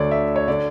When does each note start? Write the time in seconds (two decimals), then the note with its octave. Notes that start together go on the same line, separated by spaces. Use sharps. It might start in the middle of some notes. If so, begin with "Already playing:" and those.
Already playing: D2 D3 C#5 D5
0.11 E5
0.36 C#5
0.48 D3 D5